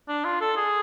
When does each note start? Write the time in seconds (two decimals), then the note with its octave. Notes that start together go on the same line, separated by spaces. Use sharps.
0.09 D4
0.25 F4
0.41 A4
0.57 G#4